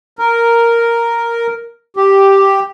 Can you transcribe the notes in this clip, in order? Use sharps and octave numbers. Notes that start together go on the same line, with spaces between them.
A#4
G4